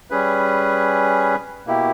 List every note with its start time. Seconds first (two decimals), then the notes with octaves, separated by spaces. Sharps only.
0.10 G3 C#4 G#4 B4
1.67 B2 A#3 E4 G4